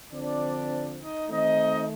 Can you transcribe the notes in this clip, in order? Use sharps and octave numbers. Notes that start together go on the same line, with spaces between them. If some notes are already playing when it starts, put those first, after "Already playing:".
D3 F3 C4 D4 D5
D#4 D#5
D#3 A3 C4 D#4 D#5